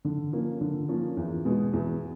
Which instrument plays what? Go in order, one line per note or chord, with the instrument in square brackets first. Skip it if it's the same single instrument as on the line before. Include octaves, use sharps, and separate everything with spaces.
[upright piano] D3
F3 A#3 C#4
D3
F3 A#3 C#4
E2
B2 G#3 B3
E2